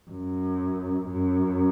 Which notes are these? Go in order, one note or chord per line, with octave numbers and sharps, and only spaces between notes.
F#2
F#2